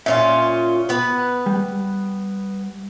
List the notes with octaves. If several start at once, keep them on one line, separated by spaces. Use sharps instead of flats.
A#2 C#4 F4 E5
B3 B4
G3